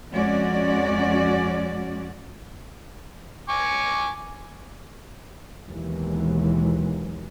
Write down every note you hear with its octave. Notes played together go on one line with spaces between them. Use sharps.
F2 G#3 C#4 F#4 D5
G#5 C#6 D6
D#2 B2 E3 F#3 G#3